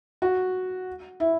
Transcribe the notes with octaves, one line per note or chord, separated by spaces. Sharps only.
F#4
E4